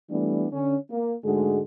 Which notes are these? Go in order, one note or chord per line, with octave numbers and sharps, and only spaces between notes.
E3 G3 A3 B3 D4
D3 C#4
A#3
G#2 D3 G#3 A3 F#4 G#4